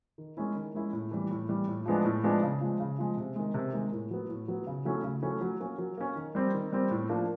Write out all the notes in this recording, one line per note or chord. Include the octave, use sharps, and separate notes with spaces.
D#3
G#3 C#4 E4
D#3
G#3 C#4 E4
A2
E3 G3
A2
E3 G3
A2
F3 G#3 B3 D4
A2
F3 G#3 B3 D4
C#3
F3 G#3
C#3
F3 G#3
C3
D#3 G#3
C3
D#3 G#3
A2
F#3 B3
A2
F#3 B3
C#3
F#3 A3 C#4 E4
C#3
F#3 A3 C#4 E4
F#3
A#3 C#4
F#3
A#3 C#4
D#3
G3 C4
D#3
G3 C4
A2
F3 A#3 D4